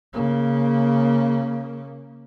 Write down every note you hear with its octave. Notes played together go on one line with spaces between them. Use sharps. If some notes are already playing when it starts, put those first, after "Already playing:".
C#3 A#3